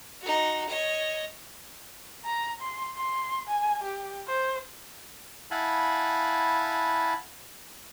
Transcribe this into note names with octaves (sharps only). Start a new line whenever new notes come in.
D#4 F#4
C#5 D#5
A#5
C6
C6
G#5
G4
C5
E4 F5 F#5 G#5 A5 B5